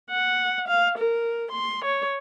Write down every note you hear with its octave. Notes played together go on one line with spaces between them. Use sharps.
F#5
F5
A#4
C6
C#5